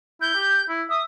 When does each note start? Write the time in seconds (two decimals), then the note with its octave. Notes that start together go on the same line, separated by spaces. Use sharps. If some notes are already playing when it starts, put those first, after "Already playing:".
0.21 E4 G6
0.34 G4
0.69 E4
0.90 E5 D#6